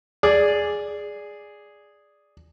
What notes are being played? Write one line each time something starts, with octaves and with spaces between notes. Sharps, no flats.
G#4 D5